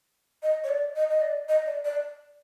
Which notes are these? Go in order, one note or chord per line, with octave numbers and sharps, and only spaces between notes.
D#5
C#5
D5
D#5
D#5
D5
D#5
D5
D5